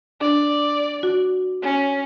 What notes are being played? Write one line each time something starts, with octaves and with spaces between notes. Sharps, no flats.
D4 D5
F#4
C#4